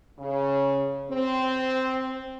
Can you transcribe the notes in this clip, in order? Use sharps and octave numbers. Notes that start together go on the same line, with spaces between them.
C#3
C4